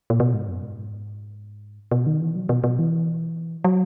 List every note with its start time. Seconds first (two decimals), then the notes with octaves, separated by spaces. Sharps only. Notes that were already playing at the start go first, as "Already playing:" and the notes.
0.10 A#2
0.20 B2
0.34 G#2
0.48 F#2
0.63 G#2
1.91 B2
2.07 D#3
2.21 E3
2.36 F#3
2.49 B2
2.64 B2
2.79 E3
3.64 F#3